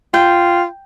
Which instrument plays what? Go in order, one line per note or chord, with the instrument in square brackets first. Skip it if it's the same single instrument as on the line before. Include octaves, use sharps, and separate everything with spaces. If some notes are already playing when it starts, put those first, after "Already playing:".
[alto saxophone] F4 [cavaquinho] G5